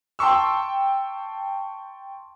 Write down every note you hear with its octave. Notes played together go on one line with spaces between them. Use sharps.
G5 A5 C6 C#6 E6